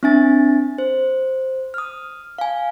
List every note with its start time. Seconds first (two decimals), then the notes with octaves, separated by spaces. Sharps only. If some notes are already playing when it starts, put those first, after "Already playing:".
0.03 C4 D4 E5 G#5 A6
0.78 C5
1.74 D#6 F6
2.38 F5 G#5